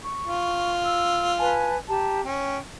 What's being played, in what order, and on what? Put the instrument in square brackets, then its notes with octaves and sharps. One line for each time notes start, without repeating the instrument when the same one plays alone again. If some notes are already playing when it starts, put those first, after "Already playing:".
[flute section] C#6
[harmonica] F4
[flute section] E6
B4 G#5 A5
G4 A5 A#5
[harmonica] C#4 [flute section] G5